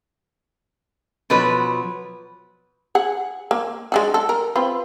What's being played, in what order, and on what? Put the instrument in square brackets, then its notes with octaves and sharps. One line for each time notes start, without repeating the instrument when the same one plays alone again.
[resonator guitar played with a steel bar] B2 F3 F#3 B4
[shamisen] G#4 F#5
A#3
G#3 D4 F#4
A4
A#4
C4 F4 B4